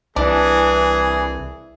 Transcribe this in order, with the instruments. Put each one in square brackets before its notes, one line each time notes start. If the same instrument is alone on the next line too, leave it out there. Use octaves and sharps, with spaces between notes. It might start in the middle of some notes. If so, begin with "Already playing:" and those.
[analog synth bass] C2 [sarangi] E3 [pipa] D4 [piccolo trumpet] G#4